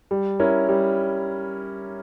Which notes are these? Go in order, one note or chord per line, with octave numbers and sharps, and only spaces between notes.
G3
C#4 E4 A#4
G3